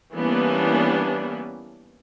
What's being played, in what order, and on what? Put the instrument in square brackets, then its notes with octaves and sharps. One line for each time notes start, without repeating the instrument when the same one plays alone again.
[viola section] E3 G3 A#3 B3 C#4 D4